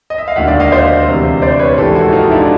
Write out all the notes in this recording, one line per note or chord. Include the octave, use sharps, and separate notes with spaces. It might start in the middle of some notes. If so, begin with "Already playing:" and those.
D#5
E5
F5
E1 D#2 D3 E5 F#5
D5 E5
D#5 F5
C5 D5
D2 C3 E3
C5 D5
B4 C#5
A#1 G#2 E3 G4 A4
E4 F#4
D#4 F4
D4 E4